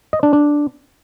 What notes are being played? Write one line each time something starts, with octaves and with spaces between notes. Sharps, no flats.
D#5
D4
D4